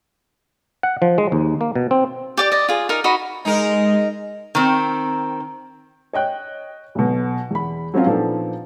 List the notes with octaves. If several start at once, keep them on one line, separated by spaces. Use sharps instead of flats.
F#5
F3
G#3
D#2
A#3
B2
C4
G4 D5 D6
D5 D#5
F4 G#4
D#4 A#4
D#4 F#4 D#5 B5
G#3 D#4 A#4
D#3 C4
C#5 D#5 G5 F#6
B1 B2
E2 B5
F#3 C4 C#4 F4
A#2 F3 B3 D4 D#4 A4